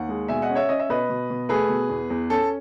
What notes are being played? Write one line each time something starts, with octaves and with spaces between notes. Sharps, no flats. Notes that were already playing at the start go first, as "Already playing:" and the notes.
Already playing: D#2 F#5
G#3
B2 E5 G#5
D#5 F#5
C#4
C#5 E5
C#4 D#5
E5
B2 B4 D#5
B2
B2
A3 G#4 B4
B2
E2
E2
C#4 A4